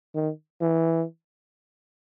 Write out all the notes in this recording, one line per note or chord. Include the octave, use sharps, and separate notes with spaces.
D#3
E3